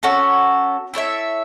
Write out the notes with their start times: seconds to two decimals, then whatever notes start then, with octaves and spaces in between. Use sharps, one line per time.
0.03 C#4 F#4 A4
0.94 E4 A4 C#5 E5